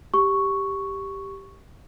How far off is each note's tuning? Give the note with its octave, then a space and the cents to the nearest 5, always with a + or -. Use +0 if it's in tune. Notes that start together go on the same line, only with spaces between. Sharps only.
G4 +0 C#6 +0